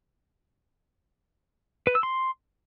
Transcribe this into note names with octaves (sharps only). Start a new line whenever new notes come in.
B4
E6
C6